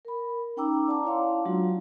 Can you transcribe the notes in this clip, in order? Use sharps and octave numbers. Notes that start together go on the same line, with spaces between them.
A#4 B5
C#4 D#4 G5 A#5 D6 E6
D5 F#5 A5 A#5 D6
E4 C#5 F5 C6
F#3 G#3 D4 F4 F#4